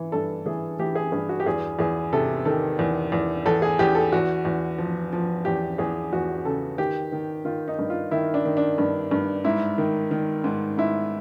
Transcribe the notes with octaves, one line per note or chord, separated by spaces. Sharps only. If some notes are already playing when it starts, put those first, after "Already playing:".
Already playing: E3
G2 A4
E3 G#4
E3 G4
G#4
G2 G#4
F#4
G4
E2 G#4
E2 G#4
C3 A4
D#3 A4
E2
E2
E2 A4
G#4
E2 G4
A4
E2 F#4
E2
F3
F3
E2 G4
E2 G#4
E2 F#4
C#3 A4
D#3 G4
D#3
D#3 F4
D#4
G2
F4
D#3 E4
D4
D#3
D4
G2
G2
G#2 E4
D#3
D#3
G#2
G#2 E4